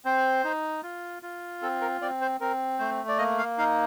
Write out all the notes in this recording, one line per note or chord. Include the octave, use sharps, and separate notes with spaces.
C4 C5
D#4
F4
F4
C4 A4
A#4
C4 D5
C5
C4 A#4
A3 C5
D5
A#3 D#5
F5
D#4 F5